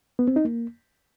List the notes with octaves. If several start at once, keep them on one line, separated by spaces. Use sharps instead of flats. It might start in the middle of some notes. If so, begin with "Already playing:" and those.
B3
C4
D#4
A#3